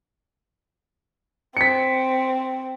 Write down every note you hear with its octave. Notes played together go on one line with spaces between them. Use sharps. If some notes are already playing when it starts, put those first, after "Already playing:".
C4 B6 C#7